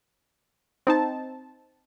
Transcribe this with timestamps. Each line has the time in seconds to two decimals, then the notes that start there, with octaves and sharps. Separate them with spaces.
0.87 C4 D#4 A5